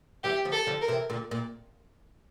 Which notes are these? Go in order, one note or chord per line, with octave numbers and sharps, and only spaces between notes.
E3 G3 G4
D3 F3
A4
D3 F3
A#4
C3 E3
A#2 D3
A#2